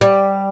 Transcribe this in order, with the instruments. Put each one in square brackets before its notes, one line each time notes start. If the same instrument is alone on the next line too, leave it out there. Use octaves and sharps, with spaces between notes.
[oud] G3